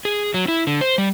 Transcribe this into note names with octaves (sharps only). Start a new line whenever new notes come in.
G#4
F#3
E4
D3
C5
G3